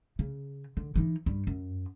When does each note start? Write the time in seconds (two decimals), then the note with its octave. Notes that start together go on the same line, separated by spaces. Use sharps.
0.19 C#3
0.77 D3
0.96 E3 D#4
1.26 G2 G3
1.47 F#2